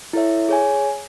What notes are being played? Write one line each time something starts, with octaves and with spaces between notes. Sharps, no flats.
E4 A4 C#5 E5
G#4 C#5 G#5